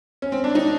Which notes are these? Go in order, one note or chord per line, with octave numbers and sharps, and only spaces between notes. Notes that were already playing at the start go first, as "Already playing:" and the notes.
C#4
C4
D4
D#4